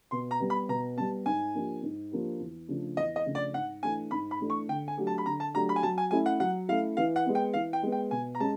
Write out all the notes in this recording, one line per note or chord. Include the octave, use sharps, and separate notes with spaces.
B2 C6
A#5
G3 B3
B5
B2 A#5
G3 B3 A5
G#2 G#5
F3 A#3 D4 G4
G#2
F3 A#3 D4 G4
E2
C#3 F3 A3 D4
E2 D#5
D#5
C#3 F3 A3 D4
D5
G#2 F#5
E3 A3 D4 G#5
G#2 B5
B5
E3 A3 D4
C#6
D3 G5
G#5
F#3 A3 D4 G4
A5
B5
D3 A#5
A5
F#3 A3 D4 G4 A#5
B5
G#5
F#3 A5
G#5
A3 C#4 E4 G#5
F#5
F#3 F#5
A3 C#4 E4 F5
E3 F5
F#5
G#3 B3
G5
E3 F5
G5
G#3 B3
G5
B2 G#5
A#5
G#3 C#4 A5